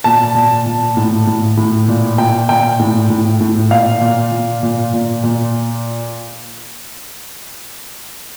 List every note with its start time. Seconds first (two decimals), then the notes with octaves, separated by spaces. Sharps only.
0.04 A#2 A5
0.35 A#2
0.66 A#2
0.97 A2
1.27 A2
1.57 A2
1.88 A#2
2.18 A#2 G5
2.49 A#2 G5
2.79 A2
3.10 A2
3.41 A2
3.71 A#2 F5
4.01 A#2
4.31 A#2
4.63 A#2
4.93 A#2
5.24 A#2